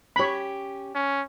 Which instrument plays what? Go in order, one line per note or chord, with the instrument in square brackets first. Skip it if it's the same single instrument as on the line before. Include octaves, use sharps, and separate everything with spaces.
[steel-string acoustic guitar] C#4 G4 [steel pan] C#5 B5
[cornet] C#4